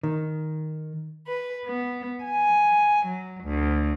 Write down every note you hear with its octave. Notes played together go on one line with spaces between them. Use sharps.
D#3
B4
B3
G#5
F#3
D2